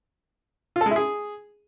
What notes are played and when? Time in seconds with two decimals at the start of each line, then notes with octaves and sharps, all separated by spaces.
0.76 F4
0.81 A4
0.86 G#3
0.91 E4
0.96 G#4